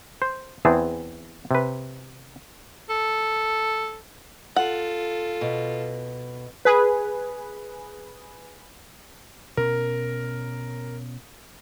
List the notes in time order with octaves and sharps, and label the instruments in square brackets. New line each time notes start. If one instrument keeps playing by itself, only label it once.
[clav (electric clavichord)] C5
E2 E3 C4 G#4 A5
C3 B4
[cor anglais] A4
[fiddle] F4 A4 [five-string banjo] F#5
[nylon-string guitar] B2
[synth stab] G#4 B4
[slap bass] B2 C#4 [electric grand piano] A#4